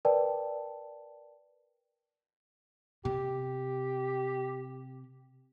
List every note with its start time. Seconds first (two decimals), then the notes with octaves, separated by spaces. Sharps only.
0.05 A#4 B4 D5 G5 A5
3.05 C3 G4